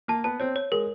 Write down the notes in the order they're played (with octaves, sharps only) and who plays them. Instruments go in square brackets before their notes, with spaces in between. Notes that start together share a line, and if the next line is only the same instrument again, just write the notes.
[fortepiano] A#3 [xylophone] A5
[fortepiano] B3 [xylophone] A5
[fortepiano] C4 [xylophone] C#5
[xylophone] C#5
[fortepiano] G#3 [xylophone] A#4